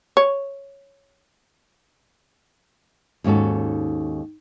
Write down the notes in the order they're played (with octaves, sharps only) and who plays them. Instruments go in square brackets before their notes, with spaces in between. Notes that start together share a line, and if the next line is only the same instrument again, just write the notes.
[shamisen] C#5
[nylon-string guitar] D#2 G#2 C#4 F#4 A4